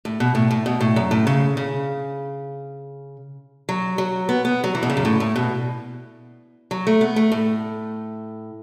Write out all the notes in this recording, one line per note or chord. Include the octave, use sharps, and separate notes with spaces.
A2
B2
A2
A2
B2
A2
F#2
A2
C#3
C#3
F#3
F#3
B3
B3
F#3
E3
B2
C#3
F#2
A2
A2
B2
F#3
A3
B3
A3
A2